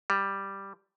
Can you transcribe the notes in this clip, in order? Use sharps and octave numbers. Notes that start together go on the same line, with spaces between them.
G3